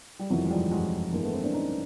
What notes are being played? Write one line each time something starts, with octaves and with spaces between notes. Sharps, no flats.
G3
F1 F2 C3 D#3 E3 F#3
G#3
F3 G3
F#3 G#3
A1 G2 E3 G#3 A#3
A3 B3
A#3 C4
C4 D4
C#4 D#4